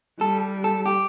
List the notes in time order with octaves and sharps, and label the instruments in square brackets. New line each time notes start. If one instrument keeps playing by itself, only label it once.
[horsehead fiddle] G3 [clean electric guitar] A4
[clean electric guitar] A4
G4